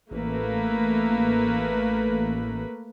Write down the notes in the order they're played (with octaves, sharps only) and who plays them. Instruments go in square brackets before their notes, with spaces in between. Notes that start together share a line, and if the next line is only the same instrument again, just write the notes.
[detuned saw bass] A1 [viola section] A3 A#3 B4